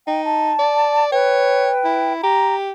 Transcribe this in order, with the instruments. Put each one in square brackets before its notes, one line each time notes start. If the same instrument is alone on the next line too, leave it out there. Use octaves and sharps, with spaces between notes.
[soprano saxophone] D#4 [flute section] G5
[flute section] A5
[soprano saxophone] D5
[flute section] B4 G5 [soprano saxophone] C#5
[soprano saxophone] E4
[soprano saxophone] G4 [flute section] A#5